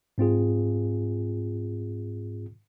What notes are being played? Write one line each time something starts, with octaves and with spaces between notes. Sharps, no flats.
G#2 C4 F4 G#4